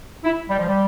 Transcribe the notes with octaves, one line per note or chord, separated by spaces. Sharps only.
E4
G3
F3
G3